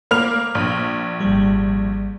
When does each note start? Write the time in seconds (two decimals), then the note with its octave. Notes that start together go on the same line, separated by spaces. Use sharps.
0.11 A#3 B5 F6 F7
0.55 A#1
1.20 G#1 G3